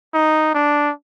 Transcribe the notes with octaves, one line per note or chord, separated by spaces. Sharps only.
D#4
D4